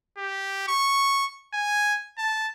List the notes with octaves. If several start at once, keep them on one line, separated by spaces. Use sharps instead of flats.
G4
C#6
G#5
A5